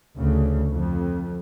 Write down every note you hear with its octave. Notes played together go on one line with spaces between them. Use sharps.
D2 C#3
F2